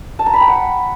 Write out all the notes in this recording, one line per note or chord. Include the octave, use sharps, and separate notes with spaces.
A5
A#5
B5
G5
F#5